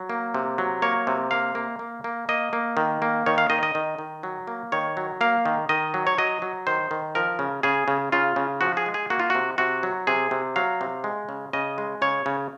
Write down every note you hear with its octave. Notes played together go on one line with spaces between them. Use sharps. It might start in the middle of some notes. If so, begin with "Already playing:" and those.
Already playing: F#3
A#3
C3
F#3
A#3 C#5
C3
A#3 F5
A#3
A#3
A#3
A#3 D#5
A#3
D#3
A#3
D#3 C#5
F5
D#3 D#5
D#5
D#3
D#3
F#3
A#3
D#3 C#5
F#3
A#3 F5
D#3
D#3 D#5
F#3
C#5
F#3 D#5
F#3
D#3 C5
D#3
F3 A#4
C#3
C#3 G#4
C#3
C#3 F4
C#3
F3 F#4
G#4
G#3
G#4
A#3 F#4
F4
C3 F#4
C3 F#4
F#3
C3 G#4
C3
F#3 F5
C3
G#3
C#3
C#3 D#5
G#3
C#3 C#5
C#3